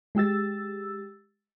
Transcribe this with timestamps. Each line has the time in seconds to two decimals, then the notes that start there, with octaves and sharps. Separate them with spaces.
0.15 G#3 G4 E6 A6